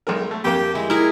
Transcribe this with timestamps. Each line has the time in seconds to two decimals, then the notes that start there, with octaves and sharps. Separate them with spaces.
0.07 B1 G#3 A#4
0.31 A3
0.44 F2 A#3 G4 G5
0.75 G#3 E4
0.90 E4 G#4 A#4